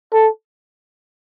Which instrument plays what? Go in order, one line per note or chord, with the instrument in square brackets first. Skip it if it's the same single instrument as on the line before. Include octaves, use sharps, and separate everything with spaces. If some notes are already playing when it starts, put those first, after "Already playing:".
[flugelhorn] A4